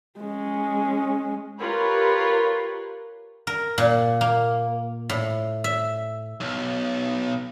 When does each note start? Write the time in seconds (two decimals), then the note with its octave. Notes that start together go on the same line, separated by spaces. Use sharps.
0.20 G#3 C#4
1.60 F4 G4 A#4 B4 C#5
3.47 A#4
3.78 A#2
4.21 A#3
5.09 A2
5.64 E5
6.40 B1